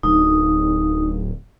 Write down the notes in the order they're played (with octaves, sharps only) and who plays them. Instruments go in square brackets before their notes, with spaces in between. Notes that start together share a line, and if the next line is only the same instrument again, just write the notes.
[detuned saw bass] D1 [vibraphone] D#4